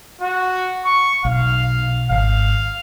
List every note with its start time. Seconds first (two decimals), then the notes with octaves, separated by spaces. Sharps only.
0.22 F#4
0.85 C#6
1.25 B1 F5
2.10 G#1 F5